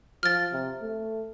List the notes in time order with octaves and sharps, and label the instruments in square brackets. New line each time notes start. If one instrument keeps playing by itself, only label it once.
[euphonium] F3 [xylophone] F6 A6
[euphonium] C3
A3